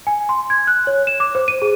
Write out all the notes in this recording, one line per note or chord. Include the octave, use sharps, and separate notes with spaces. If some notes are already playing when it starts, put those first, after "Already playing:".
G#5
C6
G#6
F#6
C#5
E7
D6
C5
D#7
G#4